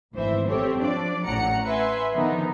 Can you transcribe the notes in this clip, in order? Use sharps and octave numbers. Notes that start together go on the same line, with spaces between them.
G#1 D2 E3 C5 E5
C4 G4 A4 C5 C#5
F3 D4 D5
A1 A2 C#4 F#5 A#5 C#7
B4 E5 G#5 C6
D3 D#3 F3 B3 D#4